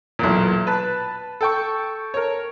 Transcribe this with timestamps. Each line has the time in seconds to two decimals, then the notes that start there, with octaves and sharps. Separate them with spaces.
0.19 B1 E2 A#2
0.67 B4 A5
1.41 A4 G5 C#6
2.14 A#4 C#5